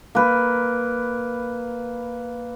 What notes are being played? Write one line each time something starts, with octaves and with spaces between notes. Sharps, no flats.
A#3 B4